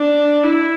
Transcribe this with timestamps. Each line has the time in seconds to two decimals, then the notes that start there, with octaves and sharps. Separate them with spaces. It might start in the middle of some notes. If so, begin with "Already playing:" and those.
Already playing: D4
0.44 E4